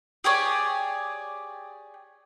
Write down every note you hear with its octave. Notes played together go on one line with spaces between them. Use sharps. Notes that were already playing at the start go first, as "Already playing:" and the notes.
G4 G#4 C#5 D5